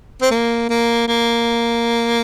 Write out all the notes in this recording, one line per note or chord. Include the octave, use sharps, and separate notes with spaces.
C4
A#3
A#3
A#3